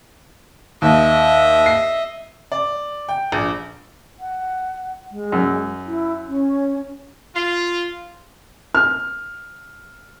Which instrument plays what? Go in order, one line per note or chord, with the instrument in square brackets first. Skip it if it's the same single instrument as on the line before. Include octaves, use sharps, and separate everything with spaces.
[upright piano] D#2 [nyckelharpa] D#5 E5
[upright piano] C7
D5
G5
A#1
[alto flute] F#5
G#3
[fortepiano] F#2
[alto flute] E4
C#4
[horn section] F4
[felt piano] F6